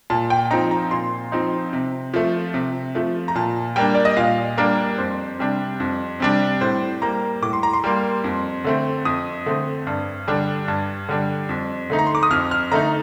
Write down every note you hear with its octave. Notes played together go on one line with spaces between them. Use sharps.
A#2 A5
G5
F3 C4 D#4 A#5
A#5
A#2 C6
F3 C4 D#4
C3
F3 A3
C3
F3 A3
A#5
A#2 A5
G3 A#3 D4 G5
D5
D#5
A#2 F5
G3 A#3 D4 A#4
F2 C5
C3 G3 D4
F2
C3 G3 D4
A2 C5
G3 A#3 A#5
A2 D6
C6
A#5
C6
G3 A#3
F2
D3 A3 C4
F2 D#6
D3 A3 C4
G2
D3 G3 D4
G2
D3 G3 D4
F2
D3 A3 D#4
A#5
C6
D6
D#6
F2 F6
F6
D3 A3 D#4 A#5